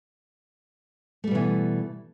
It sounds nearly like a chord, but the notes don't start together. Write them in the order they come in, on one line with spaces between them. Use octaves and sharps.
A3 G3 B2 E3